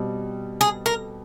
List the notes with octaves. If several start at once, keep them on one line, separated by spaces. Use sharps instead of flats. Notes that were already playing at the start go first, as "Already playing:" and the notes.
Already playing: B2 G3 C4
G#4
A#4